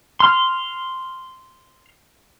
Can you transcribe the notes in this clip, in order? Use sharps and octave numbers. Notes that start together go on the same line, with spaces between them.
C6 F6